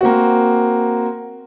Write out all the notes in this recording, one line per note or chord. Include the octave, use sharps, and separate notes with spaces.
A#3 C4 F#4